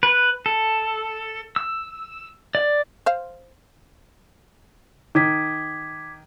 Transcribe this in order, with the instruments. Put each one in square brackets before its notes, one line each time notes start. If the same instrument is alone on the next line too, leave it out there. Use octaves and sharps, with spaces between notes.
[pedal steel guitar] B4
A4
E6
D5
[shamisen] C5 F5
[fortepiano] D#3 [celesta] D6 G#6 B6